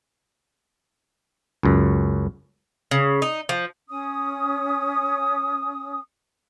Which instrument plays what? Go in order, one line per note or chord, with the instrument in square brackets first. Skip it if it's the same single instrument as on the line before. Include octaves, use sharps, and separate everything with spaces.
[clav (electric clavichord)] C#2 F#2
[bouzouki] C#3
D#4
F3
[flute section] C#4 D#6